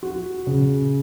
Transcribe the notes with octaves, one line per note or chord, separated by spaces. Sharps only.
F#4
C#3